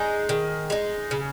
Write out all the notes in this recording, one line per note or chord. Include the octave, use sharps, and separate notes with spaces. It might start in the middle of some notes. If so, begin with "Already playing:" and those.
Already playing: G#3 D#4 G#4
D#3
G#3 D#4
C#3